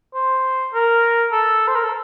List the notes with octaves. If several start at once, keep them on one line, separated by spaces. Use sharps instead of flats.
C5
A#4
A4
C5
A#4
A4